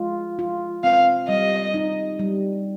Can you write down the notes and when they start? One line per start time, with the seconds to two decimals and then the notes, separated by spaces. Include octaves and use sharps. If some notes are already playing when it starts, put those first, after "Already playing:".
Already playing: G#3 F4
0.39 F4
0.84 C4 F5
1.28 G3 D#5
1.74 D#4
2.19 G3